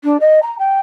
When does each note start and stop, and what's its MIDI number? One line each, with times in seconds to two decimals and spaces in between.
0.04 0.16 62
0.20 0.39 75
0.42 0.55 82
0.58 0.80 79